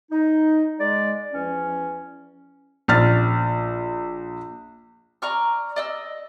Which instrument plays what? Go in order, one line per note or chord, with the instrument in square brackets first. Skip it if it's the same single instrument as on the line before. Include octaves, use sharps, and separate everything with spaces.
[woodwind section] D#4
G#3 D5
E2 F3 C#4
[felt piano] A#1 F6 A6
[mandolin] D5 A#5 C#6 F6
D5 D#5 E6